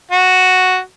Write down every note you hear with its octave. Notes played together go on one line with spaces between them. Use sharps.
F#4